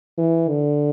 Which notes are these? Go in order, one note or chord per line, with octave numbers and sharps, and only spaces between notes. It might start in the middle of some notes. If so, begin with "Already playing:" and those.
E3
D3